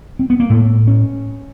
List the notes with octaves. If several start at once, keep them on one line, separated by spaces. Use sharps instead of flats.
C4
B3
A#3
A2 A3
C#4